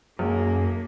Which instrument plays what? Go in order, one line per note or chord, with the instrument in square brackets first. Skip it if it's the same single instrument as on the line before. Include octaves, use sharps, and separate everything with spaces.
[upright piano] B1 [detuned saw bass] F#2 [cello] A#3 [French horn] G#4